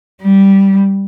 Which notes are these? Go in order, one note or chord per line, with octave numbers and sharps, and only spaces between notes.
G3